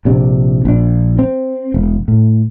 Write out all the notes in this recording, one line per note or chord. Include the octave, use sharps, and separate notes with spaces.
A#1 C3 D4
A#1 D4
C4
E1
A2